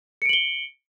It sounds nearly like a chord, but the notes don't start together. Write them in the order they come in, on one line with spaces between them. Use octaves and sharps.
C#7 D7 F#7 G7